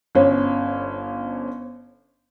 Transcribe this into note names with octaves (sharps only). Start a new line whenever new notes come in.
G1 C#4 C5